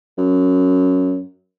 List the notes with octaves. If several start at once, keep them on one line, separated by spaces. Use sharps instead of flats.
F#2